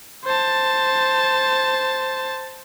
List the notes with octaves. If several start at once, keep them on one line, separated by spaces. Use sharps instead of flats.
C5 A5